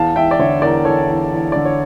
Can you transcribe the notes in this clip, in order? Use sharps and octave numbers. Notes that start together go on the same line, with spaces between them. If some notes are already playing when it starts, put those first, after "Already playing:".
Already playing: E2 F5 A5
E2 E5 G5
D5
D3 C#5 E5
E2 A#4 D5
E2 A4 C#5
E2
E2
D3 D5
C#5